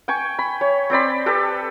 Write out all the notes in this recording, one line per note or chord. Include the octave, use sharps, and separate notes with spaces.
G5 G#5 C#6
B5
C#5
C4 C5 D5 B5
G4 A4 B4